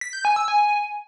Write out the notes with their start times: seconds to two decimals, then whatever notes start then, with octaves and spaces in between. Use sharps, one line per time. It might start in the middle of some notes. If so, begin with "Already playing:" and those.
0.01 B6
0.13 G6
0.25 G#5
0.36 E6
0.48 G#5